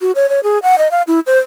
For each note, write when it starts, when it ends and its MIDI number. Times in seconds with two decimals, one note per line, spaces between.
0.01 0.12 66
0.15 0.29 73
0.29 0.40 73
0.43 0.59 68
0.63 0.78 78
0.78 0.90 75
0.91 1.02 77
1.07 1.20 64
1.27 1.38 72